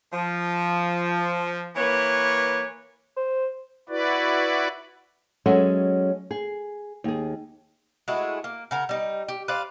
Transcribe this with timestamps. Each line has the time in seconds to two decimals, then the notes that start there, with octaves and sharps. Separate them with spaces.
0.12 F3
1.76 E3 A#3 B4 C#5
3.17 C5
3.89 E4 F#4 B4 D5
5.46 F#3 G#3 C#4 A4 E5
6.31 G#4
7.04 D#2 G#4
8.08 G#3 A3 E4 F#4
8.44 A#3
8.71 C#3 F#4 A#4
8.89 G3 D#4
9.28 G4
9.48 B4 C5 D5 F5